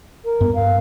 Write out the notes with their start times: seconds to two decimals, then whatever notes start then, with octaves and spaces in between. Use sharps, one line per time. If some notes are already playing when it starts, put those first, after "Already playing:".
0.25 A#4
0.41 G2 B3
0.55 F5